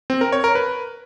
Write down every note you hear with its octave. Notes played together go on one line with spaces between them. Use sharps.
C4
A#4
C#5
A#4
B4